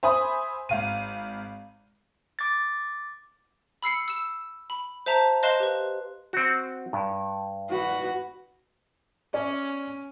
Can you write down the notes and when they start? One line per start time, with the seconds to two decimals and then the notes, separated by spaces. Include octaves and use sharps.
0.03 C5 E5 G#5 B5 D#6
0.69 G#1 F5 D#7
2.39 D6 A6
3.82 B5 E6 C7 C#7
4.08 E6 E7
4.70 B5
5.06 C5 E5 A5 A#5
5.43 C5 D#5 F5 C6 F#6 E7
5.60 G4 B4
6.33 C4 F#4
6.93 G2
7.69 F#4 B4
9.34 C#4 D5 E5